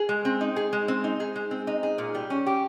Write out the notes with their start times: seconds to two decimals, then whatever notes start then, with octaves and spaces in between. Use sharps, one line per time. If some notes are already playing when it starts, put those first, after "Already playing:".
Already playing: G#4
0.09 G#3
0.25 C4
0.41 D#4
0.56 G#4
0.73 G#3
0.88 C4
1.04 D#4
1.20 G#4
1.36 G#3
1.51 C4
1.67 D#4
1.83 G#4
1.98 A#2
2.15 G3
2.30 C#4
2.46 G4